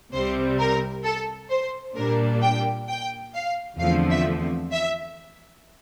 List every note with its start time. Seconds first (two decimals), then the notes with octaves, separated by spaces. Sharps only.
0.13 C2 C3 G3 C4 C5
0.59 A#4
1.04 A4
1.50 C5
1.96 A#2 G3 A#3 D4 A#4
2.42 G5
2.89 G5
3.35 F5
3.79 E2 D3 F3 A3 C4 F5
4.10 E5
4.72 E5